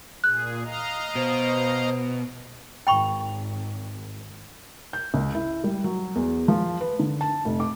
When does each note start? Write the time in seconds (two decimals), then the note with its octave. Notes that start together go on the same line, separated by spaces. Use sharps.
0.24 A#2 G#4 F#6
0.64 D#5 F5 A#5
1.15 B2 C5
2.87 G#1 G5 B5 C#6
4.93 G6
5.14 C#2
5.35 E4
5.64 G3
5.84 F#3
6.15 E2
6.48 F3
6.81 B4
6.99 D3
7.21 A5
7.45 F1
7.60 D6